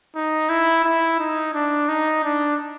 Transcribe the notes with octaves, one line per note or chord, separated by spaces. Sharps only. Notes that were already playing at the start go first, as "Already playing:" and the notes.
D#4
E4
E4
D#4
D4
D#4
D4